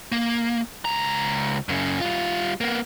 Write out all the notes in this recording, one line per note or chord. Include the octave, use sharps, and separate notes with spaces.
A#3
C#2 A#5
F#2 C#3
G3 F4
A#3 B3